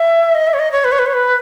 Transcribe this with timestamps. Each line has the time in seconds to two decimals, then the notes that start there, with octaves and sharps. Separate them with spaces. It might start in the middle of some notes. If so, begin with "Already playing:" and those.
Already playing: E5
0.34 D#5
0.47 E5
0.53 C#5
0.59 D#5
0.71 C#5
0.84 B4
0.91 C#5
0.98 B4
1.06 C#5
1.13 B4